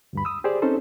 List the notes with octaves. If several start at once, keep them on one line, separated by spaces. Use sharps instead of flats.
D2 G2 B5
D#6 E6
G4 G#4 C5 D5
C4 C#4 D#4 A4 C5